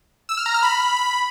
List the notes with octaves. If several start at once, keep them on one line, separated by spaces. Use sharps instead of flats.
E6
F6
A#5
F6
B5